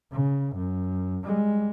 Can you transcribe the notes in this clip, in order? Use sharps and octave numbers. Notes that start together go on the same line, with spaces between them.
C#3
F#2
G3 G#3